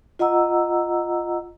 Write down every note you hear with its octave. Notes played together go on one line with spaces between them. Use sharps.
F4 D#5 F#5 A#5 E6